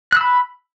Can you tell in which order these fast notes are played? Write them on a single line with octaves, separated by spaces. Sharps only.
F#6 E6 B5